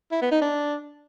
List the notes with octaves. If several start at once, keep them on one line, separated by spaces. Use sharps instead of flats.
E4
B3
D#4
D4